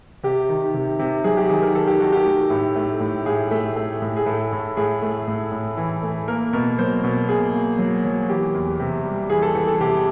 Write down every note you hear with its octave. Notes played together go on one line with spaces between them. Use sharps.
C3 G4
D#3
C3
C3
F#3 G#4
G4
D#3 G#4
A#4
D#3 A4
G4
D#3 F#4
G4
A3
A2
A3
A2
A2 G#4
A3
A3
A2
G#4
A2 A4
A2
A2 G#4
A3
A2
A2
E3
A3
A#3 A#4
B2 A#4
F#3 C5
B2
A#3 G#4
A#3
F#3
F#3
E3 G4
E2
C3
G3
E3 G#4
A4
E3 A4
A4
C3 G4